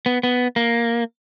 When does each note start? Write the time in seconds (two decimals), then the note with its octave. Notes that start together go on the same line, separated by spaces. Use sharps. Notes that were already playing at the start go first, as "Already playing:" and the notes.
0.06 B3
0.23 B3
0.56 A#3